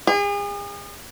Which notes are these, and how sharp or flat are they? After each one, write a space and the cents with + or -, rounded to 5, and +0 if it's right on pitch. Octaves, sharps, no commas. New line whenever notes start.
G#4 -40